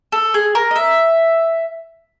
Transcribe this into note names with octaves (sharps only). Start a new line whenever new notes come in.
A4
G#4
A#4
D#5
E5